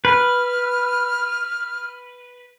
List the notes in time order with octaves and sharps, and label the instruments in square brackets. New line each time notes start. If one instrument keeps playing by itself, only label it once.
[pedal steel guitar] B4 [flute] F6